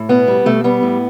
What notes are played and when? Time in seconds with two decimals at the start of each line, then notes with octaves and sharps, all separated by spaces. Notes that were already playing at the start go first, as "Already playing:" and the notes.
Already playing: A2
0.09 B2 B3
0.28 G3
0.46 B2 A3
0.64 G3 B3
0.83 A2